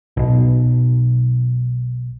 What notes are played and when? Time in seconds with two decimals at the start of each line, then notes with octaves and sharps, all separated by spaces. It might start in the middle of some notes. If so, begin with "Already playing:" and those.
0.17 B1 B2